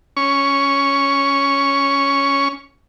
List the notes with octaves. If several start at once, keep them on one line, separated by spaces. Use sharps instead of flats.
C#4 C#6